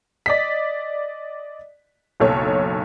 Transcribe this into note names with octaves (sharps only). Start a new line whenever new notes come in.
D5 D#5 B6
F#1 B1 A4 C#5